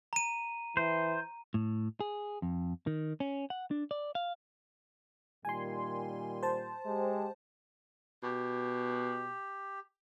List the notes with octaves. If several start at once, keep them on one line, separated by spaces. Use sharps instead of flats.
A#5 D#7
E3 C5
A2
G#4
F2
D#3
C#4
F#5
D4
D5
F5
A#2 D#3 G3 G#5 C6
C5 A5
G#3 G4
B2 G4